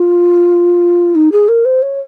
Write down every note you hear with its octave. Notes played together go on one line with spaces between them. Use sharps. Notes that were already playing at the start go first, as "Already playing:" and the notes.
Already playing: F4
D#4
G#4
A#4
C5
C#5